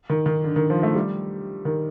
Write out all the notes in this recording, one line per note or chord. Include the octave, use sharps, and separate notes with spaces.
D#3
D#3
D3
D#3
F3
A3
G3
D#3